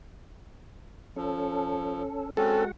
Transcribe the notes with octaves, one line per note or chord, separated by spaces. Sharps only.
F3 C#4 A4
G#3 C4 C#4 F#4 A4 F#5